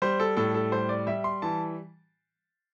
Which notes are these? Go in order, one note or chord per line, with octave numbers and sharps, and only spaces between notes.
G3 C5
A4
A2 A4
A4
G3 C5
D5
G3 E5
C6
E3 A5